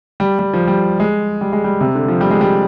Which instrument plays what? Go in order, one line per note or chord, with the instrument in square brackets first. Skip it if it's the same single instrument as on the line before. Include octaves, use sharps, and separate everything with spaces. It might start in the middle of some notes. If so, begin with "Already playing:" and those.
[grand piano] G3
G3
F3
G3
G#3
G3
G#3
G3
C3
D3
F3
G3
G#3
G3